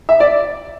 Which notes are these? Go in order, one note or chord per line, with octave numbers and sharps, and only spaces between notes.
E5
D5